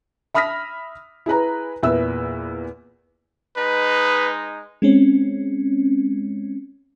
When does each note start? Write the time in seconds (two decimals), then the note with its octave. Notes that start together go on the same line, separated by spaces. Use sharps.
0.34 E5 B5 D#6 F6 A#6 B6
1.26 E4 G#4 B4 A#5
1.83 E2 A#2 B4 E5 E6
3.57 G#3 D#4 B4
4.82 G#3 C4 C#4